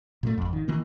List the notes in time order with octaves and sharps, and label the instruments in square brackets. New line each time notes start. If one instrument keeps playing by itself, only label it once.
[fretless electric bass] A#2 G3 A3
G#1 F2
D#3
D#3 E3 A#3